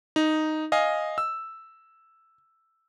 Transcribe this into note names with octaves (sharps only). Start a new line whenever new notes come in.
D#4
D#5 F5 G#5
E6